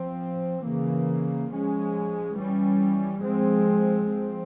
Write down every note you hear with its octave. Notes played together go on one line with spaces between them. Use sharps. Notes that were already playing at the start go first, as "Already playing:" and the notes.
Already playing: F3 C4
C#3 E3 A#3
F3 G#3 C#4
E3 G3 C#4
F3 G#3 C4
F3 C4